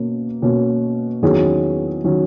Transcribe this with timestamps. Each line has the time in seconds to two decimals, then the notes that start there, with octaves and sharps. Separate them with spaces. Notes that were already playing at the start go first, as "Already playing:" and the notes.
Already playing: B2 A#3 C#4
0.42 B2 A#3 C#4
1.22 E2 D#3 F#3 C#4 G#4
2.04 D#3 F#3 C#4